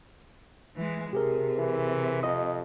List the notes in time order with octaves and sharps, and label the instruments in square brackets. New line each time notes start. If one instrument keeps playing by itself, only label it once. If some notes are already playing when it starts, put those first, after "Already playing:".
[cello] E3 G#3
[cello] C3 [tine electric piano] G4 G#4 A#4
[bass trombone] E3
[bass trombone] F2 [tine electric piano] D#5 D#6